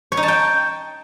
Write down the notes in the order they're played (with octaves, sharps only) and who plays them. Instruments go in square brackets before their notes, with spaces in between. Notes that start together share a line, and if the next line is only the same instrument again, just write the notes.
[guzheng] C#5
D#4
A5
G5